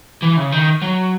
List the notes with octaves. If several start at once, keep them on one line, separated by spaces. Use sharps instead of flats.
E3
C#3
D#3
F#3